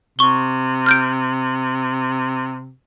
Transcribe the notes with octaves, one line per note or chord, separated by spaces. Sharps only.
C3 C#6 G7
F6 G6 D7